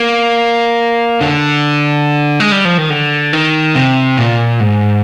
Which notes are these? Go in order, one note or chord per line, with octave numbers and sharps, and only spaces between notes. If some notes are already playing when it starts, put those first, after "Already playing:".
Already playing: A#3
D3
G#3
G3
F3
D#3
D3
D#3
C3
A#2
G#2